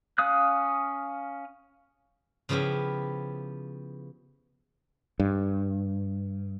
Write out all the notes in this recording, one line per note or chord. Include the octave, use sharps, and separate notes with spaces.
C#4 F5 D#6 F#6
C#3 F3 B3 E4 G4
G2